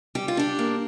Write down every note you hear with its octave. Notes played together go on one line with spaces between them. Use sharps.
G3 G4
F4
D4 G4
A#3